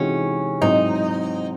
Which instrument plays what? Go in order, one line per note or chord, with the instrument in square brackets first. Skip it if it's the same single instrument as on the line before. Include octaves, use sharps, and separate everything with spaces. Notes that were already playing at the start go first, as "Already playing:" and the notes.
Already playing: [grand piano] C3 E3 G#3 D#4 F#4 [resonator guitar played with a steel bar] C#4
[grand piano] G#2 F#3 C4 E4 [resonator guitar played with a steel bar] D#4